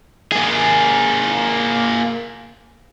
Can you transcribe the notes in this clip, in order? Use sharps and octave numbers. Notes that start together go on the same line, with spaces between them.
A#3 G#4